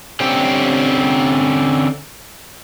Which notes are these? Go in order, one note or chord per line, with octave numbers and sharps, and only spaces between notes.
D3 C4 C#4 G4